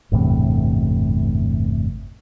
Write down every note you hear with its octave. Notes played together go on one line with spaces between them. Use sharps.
G1 E2 A2 C3